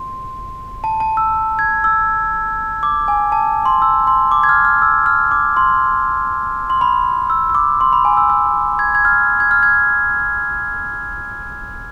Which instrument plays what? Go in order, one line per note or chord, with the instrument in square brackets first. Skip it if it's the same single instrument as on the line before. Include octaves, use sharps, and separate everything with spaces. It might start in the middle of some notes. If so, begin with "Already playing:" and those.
Already playing: [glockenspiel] C6
A5
A5
E6
G#6
E6
D6
G#5
A5
C6
E6
C6
D6
G#6
F6
F6
E6
F6
D6
C6
C6
B5
E6
E6
D6
C6
B5
G#5
E6
E6
G#6
G#6
F6
G#6
F6
G#6